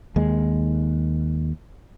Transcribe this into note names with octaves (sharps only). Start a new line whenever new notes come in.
D#2 G#3